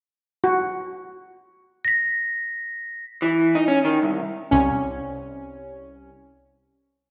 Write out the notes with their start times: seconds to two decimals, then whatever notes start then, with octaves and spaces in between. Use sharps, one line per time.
0.44 F#4
1.85 A#6 B6
3.22 E3
3.55 D#4
3.68 C#4
3.85 D#3
4.02 C2
4.51 C2 C#4